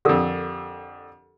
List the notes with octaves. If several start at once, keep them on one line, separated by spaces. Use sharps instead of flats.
F2 D3 G4 A4 A#4